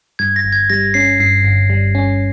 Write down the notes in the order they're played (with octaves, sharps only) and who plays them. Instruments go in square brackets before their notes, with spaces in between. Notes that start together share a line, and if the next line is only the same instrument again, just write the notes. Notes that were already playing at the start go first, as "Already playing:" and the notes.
[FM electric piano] G2 [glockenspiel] G#6
[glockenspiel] A#6
[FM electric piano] G1
[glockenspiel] G#6
[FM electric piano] G3 [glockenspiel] A#6
[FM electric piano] C#4 [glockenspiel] C7
[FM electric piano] G2 [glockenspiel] C7
[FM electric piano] G1
G3
C#4